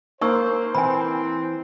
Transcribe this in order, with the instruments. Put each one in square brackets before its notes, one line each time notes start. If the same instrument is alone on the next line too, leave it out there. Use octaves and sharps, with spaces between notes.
[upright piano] A#3 [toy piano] D#4 C#6 E6 [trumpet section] C5
[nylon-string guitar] E3 [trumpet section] C4 [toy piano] G#5 B5